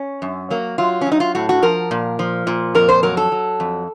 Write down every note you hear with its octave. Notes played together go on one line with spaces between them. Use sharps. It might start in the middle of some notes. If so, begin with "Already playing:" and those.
Already playing: C#4
F#2
F#3 A#3
F#3 F4
C#4
F#3
D#4
F4
A2 F#4
F#4
F3 A#4
A#2
F3
A#2
F2 A#4
C5
F#3 A#4
A4
F#3
F2